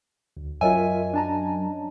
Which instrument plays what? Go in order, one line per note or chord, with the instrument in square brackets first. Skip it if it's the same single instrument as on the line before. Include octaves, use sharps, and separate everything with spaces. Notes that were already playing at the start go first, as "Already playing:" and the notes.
[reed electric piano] D2
[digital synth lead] F#2 [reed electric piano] F4 A#4 E5 [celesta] C#5 D#5 [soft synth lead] G#5
[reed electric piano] D4 A5 A#5